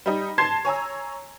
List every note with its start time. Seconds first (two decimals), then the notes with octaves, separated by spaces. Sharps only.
0.06 G3 D#4
0.38 A5 C6 G#6 C7
0.65 C#5 G#5 A#5 E6